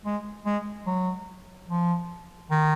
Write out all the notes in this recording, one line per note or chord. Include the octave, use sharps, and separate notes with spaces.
G#3
G#3
F#3
F3
D#3